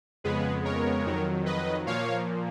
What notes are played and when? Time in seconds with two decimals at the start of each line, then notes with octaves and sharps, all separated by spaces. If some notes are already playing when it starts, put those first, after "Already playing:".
0.24 F2 C#3 G#3 B3 G#4 B4
0.65 A#4 C#5
1.05 F2 D#3 F#3
1.46 B4 D#5
1.86 A#2 F3 A#3 C#5 F5